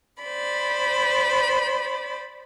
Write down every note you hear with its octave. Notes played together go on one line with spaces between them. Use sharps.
C5 D5 B5